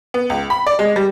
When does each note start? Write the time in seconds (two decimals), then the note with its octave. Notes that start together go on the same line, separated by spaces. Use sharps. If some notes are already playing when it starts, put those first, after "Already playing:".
0.14 B3
0.30 C#2
0.50 B5
0.67 D5
0.79 G#3
0.96 G3